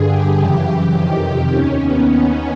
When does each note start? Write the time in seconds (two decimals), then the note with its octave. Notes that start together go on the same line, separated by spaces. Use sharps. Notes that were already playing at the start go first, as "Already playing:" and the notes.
Already playing: G2 D3 G#4
0.09 G4
0.38 F#2 C#3 E3 G4
0.95 F2 C3 D#3
1.52 D#2 D#3 C#4
1.81 B3